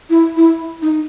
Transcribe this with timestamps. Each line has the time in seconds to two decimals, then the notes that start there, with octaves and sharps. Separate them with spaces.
0.10 E4
0.37 E4
0.82 D#4